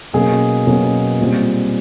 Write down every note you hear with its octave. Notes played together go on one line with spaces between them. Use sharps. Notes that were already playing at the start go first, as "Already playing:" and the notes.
B2 F#3 A#3 C#4 G#4
B2 F#3 A#3 C#4
A#2 G3 C4